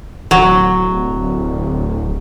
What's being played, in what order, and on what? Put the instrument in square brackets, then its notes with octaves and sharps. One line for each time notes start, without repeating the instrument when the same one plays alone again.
[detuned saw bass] D1 [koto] F#3